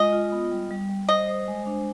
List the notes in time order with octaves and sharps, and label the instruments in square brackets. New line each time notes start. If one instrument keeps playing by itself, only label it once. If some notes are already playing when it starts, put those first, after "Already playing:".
Already playing: [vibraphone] G#3 F4 [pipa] D#5
[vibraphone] F4
B3
G3
G3
G3
[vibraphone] C5 [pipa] D#5
[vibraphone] C5
G#3
D4